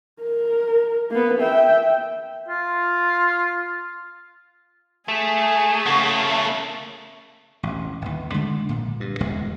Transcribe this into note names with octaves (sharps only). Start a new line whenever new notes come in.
A#4
A#3 B3
E5 G5
F4
A3 G#4
C#3 A#3 F#5 C#6
E1 A1
G1 D#2
D3 G#3 A3
A#1 A#2
G2
D1 G1 E2 G#3